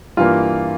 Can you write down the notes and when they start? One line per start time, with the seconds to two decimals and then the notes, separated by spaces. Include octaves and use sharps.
0.17 G2 E3 A#3 F4